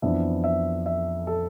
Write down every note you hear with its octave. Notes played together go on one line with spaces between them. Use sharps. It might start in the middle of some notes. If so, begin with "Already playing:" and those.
F2 E3 B3 D4 E5
E5
E5
A4